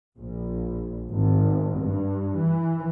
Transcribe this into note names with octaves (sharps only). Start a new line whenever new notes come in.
A#1
G#1
G2
E3